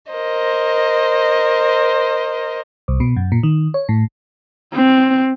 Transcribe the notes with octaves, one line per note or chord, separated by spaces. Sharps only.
A#4 C5 D#5
C2
B2
F#2
A#2
D#3
C#5
A2
C4